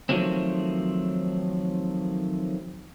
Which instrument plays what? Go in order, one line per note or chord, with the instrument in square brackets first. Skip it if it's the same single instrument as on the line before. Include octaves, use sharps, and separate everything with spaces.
[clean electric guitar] D#3 F3 F#3 A3 C4